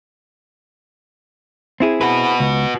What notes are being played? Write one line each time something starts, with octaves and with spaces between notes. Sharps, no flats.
C4 E4 G#4
F#4 B4
C#2